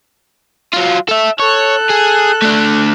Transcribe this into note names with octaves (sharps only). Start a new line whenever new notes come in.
F#3 F4
A4 E5
A4 C#5 F#6
G#4
A3 D4